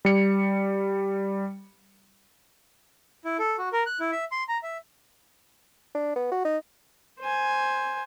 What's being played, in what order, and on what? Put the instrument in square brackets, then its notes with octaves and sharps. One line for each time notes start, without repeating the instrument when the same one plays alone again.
[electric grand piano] G3 C#7
[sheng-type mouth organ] E4
A4
F#4
A#4
F#6
E4
E5
C6
A#5
E5
[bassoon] D4
B3
F#4
D#4
[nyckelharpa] C5 G#5